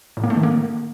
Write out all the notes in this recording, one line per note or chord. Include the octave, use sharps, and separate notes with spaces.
A2
A#3
A3
D#3
A#3